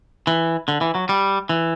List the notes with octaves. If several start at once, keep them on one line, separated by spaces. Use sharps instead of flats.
E3
D3
E3
F#3
G3
E3